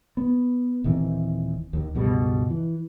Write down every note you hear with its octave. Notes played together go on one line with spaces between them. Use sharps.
B3
D#1 D#3 E3 C4
D#2 D#3
C#2 G2 B2 G3
E3